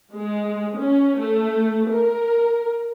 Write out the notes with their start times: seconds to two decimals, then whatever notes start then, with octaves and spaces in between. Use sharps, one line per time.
0.14 G#3
0.76 C#4
1.18 A3
1.88 A#4